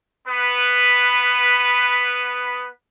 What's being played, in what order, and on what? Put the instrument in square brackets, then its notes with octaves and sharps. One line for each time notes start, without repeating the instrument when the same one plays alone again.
[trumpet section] B3 B4